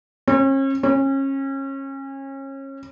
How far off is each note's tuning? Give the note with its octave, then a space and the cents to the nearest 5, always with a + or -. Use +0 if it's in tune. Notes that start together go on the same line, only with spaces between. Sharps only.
C#4 -40
C#4 -30